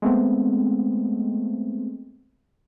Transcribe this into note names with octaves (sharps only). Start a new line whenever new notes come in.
G#3 A3 B3 C4